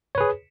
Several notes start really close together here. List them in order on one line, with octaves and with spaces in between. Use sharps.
C#5 B4 G#4